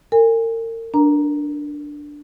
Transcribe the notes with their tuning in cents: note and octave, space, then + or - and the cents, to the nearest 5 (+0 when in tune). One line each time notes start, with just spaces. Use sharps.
A#4 -40 G#5 -30
D4 +0 A#4 +20 A#5 +0